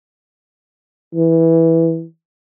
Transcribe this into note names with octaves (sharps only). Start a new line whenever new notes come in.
E3